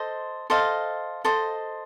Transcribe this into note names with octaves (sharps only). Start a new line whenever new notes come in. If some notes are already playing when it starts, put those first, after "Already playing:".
Already playing: A4 C5 D#5
A4 C5 D#5 F5
A4 C5 D#5